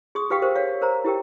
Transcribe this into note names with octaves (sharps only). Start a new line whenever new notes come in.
G#4 C6 D#6
G4 B4 F5 G5
G4 A#4 C5 F5
C#5 F5
A#4 C5 A#5
E4 G4 A#4 G5